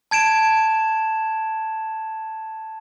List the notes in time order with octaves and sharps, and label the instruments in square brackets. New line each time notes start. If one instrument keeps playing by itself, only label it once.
[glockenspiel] A5 G#6 D7 E7